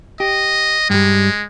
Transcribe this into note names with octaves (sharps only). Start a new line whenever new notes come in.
G4 D#5
G2 G3 G#3